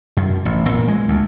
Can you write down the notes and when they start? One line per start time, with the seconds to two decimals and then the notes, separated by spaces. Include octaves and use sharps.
0.17 F#2
0.45 A1
0.69 A#2
0.88 G#3
1.08 D2